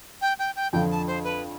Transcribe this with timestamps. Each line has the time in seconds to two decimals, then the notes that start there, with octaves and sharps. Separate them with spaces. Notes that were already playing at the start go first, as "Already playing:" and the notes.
0.21 G5
0.39 G5
0.56 G5
0.73 F2 D3 F3 G5
0.90 A5
1.07 C5
1.24 B4